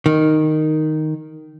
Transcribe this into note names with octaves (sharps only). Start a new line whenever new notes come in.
D#3